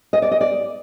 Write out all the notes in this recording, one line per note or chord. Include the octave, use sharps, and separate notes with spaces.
D#5
D5
D#5
D5